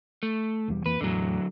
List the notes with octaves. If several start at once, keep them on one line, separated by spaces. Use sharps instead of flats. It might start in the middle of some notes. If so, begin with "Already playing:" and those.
A3
E1 E2 G3
F2 E3 A#3 B4
E2 A2 D3 F#3